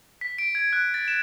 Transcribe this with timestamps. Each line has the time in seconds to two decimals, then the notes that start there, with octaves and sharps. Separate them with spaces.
0.21 B6
0.38 D7
0.55 G#6
0.73 F#6
0.94 A6
1.08 E7